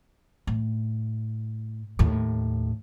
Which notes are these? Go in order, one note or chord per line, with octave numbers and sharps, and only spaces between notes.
A2
D#2 A2